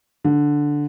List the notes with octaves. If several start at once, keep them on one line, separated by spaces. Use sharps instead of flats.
D3